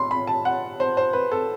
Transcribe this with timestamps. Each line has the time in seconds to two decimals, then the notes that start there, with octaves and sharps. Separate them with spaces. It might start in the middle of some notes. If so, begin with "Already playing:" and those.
Already playing: B1 B5 C6
0.11 B5
0.27 A5
0.45 F#5
0.80 C5
0.97 C5
1.13 B4
1.32 A4